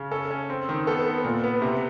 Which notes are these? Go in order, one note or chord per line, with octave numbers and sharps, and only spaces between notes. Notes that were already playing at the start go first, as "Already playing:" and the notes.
Already playing: C#3
C#4 A4
C#4
C4
D#3
B3 A4
B3
A#2
B3
C3